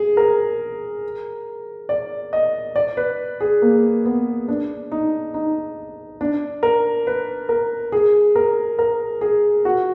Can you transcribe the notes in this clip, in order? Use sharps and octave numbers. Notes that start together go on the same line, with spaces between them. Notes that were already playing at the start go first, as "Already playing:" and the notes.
Already playing: G#4
A#4
D5
D#5
D5
B4
G#4
A#3
B3
D4
D#4
D#4
D4
A#4
B4
A#4
G#4
A#4
A#4
G#4
F#4